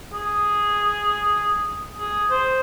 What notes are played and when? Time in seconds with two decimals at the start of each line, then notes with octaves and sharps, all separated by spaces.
0.13 G#4
1.98 G#4
2.30 C5